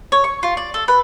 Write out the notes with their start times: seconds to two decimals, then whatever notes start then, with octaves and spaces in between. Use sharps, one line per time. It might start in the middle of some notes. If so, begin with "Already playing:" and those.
0.12 C#5
0.24 C#6
0.43 F4
0.57 D5
0.74 A4
0.88 B4